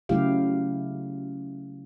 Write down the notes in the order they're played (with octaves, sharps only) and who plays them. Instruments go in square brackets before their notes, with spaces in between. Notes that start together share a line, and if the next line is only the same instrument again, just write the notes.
[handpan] C#3 F#3 A3 E4 G4 F5